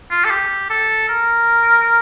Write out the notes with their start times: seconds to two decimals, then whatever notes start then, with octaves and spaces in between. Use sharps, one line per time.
0.11 F4
0.25 A4
0.31 G4
0.70 A4
1.09 A#4